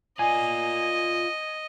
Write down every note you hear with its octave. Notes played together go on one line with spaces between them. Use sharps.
F4 D5 D#5 G#5